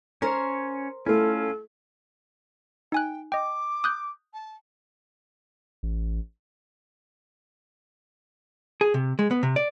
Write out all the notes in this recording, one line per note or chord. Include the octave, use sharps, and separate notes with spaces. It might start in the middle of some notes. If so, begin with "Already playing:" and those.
C#4 A#4 C5 C#5
A3 C#4 E4 F4 A4
D#4 G5 G#5 F#6
D#5 G5 D6
D#6 F#6 G6
A5
A1
G#4
C3
G#3
B3
C3
D5